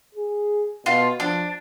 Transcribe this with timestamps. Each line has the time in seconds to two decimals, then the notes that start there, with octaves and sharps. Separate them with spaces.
0.15 G#4
0.86 B2 F4
1.20 F3 D4